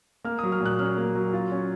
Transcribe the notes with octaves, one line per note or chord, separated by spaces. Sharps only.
A#3 F6
D#6
F#3
F6
A#2 F#6
C#4 F6
A#3
F#3
F4
C#4